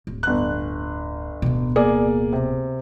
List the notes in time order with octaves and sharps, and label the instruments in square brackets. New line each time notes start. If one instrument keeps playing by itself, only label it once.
[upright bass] D1
[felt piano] G1 F#6
[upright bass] D1 B2
[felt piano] A#3 G#4 D5
C3